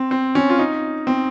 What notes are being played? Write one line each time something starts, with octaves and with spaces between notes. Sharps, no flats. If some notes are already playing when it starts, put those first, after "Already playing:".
Already playing: C4
C4
C#4
F4
D#4
C4